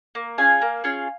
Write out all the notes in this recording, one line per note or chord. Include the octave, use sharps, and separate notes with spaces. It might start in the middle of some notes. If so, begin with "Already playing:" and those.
A#3
C#4 F4 G#4 F5 G#5
A#3
C#4 F4 G#4